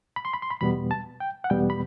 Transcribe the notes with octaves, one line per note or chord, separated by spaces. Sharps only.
B5
C6
B5
C6
B5
E2 B2 G3 B3 B5
A5
G5
F#5
E2 B2 G3 B3 G5
B5